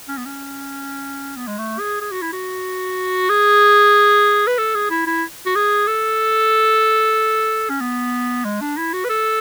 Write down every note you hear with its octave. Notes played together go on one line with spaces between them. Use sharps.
C#4
B3
C#4
B3
G#3
A3
G#4
G#4
F#4
E4
F#4
G#4
B4
A4
G#4
E4
E4
F#4
G#4
A4
C#4
B3
G#3
D4
E4
F#4
B4
A4